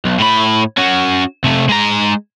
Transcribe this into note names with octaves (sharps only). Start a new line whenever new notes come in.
B1
A2 B5
C#4 F#4
C3 A3
G#3 A#5